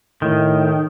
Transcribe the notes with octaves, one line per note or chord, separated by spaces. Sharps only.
A2 D#3